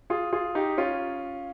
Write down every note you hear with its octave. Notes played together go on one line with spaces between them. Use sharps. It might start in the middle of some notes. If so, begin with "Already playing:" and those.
F4 G#4
F4 G#4
D#4 G4
C#4 F4